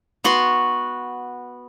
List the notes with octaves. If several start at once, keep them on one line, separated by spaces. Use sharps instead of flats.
B3 F#4 C6